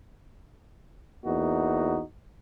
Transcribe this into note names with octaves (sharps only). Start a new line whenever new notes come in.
E2 A#3 D#4 F#4